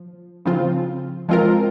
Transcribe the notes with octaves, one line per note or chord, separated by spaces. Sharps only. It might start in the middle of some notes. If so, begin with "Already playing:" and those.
Already playing: F3
C#3 F3 C4 F4
F3 G#3 C4 F4 A#4